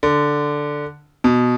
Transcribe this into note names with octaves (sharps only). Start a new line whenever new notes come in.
D3
B2